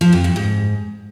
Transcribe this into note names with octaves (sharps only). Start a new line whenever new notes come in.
F3
F2
G2
G#2